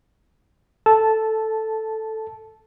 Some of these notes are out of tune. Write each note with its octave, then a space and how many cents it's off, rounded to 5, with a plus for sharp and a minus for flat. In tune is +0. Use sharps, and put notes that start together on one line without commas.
A4 +0 A5 -10